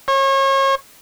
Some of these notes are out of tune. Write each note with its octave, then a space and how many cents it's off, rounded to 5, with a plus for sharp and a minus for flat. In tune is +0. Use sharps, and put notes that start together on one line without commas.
C#5 -35